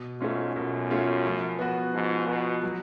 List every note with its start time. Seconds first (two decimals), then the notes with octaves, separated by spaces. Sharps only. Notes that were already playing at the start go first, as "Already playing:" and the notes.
Already playing: B2
0.21 G#2 A3 C#4 F4
0.56 F#2 B2
0.91 A3 C#4 F4
1.25 F3
1.59 B3 F#4
1.94 G#2 F3
2.28 B2 B3 F#4
2.63 F#3